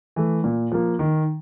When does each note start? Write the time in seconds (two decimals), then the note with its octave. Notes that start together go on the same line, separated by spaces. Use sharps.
0.16 E3 A3
0.44 A#2
0.72 F3 A#3
0.99 D#3